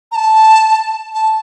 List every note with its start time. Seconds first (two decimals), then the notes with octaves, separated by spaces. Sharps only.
0.12 A#5
0.15 A5
1.14 A5